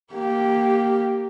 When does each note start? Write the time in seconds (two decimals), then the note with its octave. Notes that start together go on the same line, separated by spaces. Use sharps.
0.14 A#3 G4